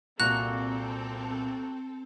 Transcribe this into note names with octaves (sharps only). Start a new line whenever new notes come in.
C2 A#2 A#3 C4 F#4 A4 F#6 F7